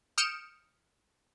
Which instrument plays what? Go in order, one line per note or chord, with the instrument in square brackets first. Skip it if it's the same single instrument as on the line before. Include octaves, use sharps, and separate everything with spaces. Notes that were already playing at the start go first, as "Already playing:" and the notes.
[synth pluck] D#6 F6 G6 C#7 D7 E7